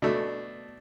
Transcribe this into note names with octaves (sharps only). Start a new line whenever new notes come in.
B2 A3 D4